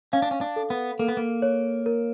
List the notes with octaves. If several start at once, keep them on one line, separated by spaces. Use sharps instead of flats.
C#4 F5
D4
C#4
D4
A4
B3
A#3 A4
B3
A#3
C#5
A#4